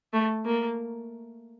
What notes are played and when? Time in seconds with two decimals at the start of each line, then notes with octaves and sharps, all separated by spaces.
0.13 A3
0.45 A#3